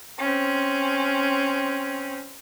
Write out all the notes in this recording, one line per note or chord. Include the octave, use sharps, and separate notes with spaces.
C4 C#4